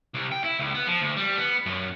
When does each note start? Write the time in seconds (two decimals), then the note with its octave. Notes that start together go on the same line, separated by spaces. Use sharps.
0.14 C2
0.32 G5
0.44 E4
0.59 C#2
0.74 B3
0.87 F3
1.01 D2
1.16 G3
1.37 B3
1.66 F#2